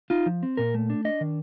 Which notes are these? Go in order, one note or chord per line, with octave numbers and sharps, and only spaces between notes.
D#4 F4
F3
C4
A#2 A#4
A3
D4
D4 D#5
D#3